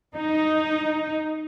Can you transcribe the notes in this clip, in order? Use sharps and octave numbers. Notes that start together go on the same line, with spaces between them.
D#4